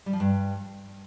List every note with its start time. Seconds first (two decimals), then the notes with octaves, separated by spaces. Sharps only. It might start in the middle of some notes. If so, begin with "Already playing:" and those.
0.06 G3
0.13 F3
0.20 G2